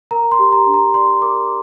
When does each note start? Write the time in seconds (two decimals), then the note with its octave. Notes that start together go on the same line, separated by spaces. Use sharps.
0.11 A#4 A#5
0.31 C6
0.39 G4
0.52 A#5
0.66 D4
0.74 A#5
0.94 D5 C6
1.21 A#4 D6